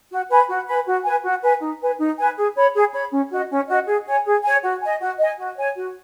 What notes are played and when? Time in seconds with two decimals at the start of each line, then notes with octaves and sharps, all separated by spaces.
0.11 F#4
0.29 B4 G#5 B5
0.48 F#4
0.67 B4 G#5 B5
0.86 F#4
1.04 B4 G#5
1.24 F#4
1.43 B4 G#5
1.61 D#4
1.81 B4 G#5
1.99 D#4
2.18 B4 G#5
2.37 G#4
2.55 C#5 B5
2.74 G#4
2.93 C#5 B5
3.12 C#4
3.31 F#4 D#5
3.50 C#4
3.68 F#4 D#5
3.87 G#4
4.06 C#5 G#5
4.25 G#4
4.44 C#5 G#5
4.63 F#4
4.82 D#5 G#5
5.00 F#4
5.19 D#5 G#5
5.38 F#4
5.57 C#5 G#5
5.75 F#4